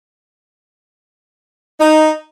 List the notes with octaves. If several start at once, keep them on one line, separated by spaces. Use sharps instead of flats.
D#4